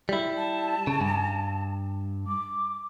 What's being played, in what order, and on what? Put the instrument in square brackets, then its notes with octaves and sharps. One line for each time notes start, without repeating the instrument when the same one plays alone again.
[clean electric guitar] G3 E4
[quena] A5
[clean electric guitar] C#3
G2
[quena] D6